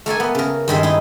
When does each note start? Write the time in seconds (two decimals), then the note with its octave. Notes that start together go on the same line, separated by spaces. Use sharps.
0.06 A3 A#3 A4 G#5
0.20 B3
0.35 C#3 A#4
0.68 G2 D#3 G#3 E5
0.83 D#4 E4